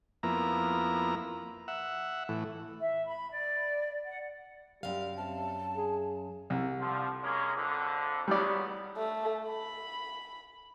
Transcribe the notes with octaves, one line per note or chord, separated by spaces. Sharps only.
F2 A#3 B3 E4 A#5
E5 F#5
A2 E3
E5
B5
D5
F#5
F#2 G3 F5
C3 A5
G#4
C2
G2 D3 F3
G#3 A#3 C#4
F2 D3
C#2 F#3 G3 B3 D5
A3
B5